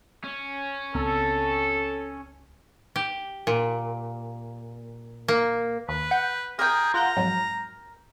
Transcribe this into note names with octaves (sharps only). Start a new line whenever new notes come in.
C#4
C#2 B3 C4 A4
G4
A#2
A#3
D#2 B4
F#5 G6
G#4 A#4 G5
F4 F#5 A#5 G6
F2 G#2 F#3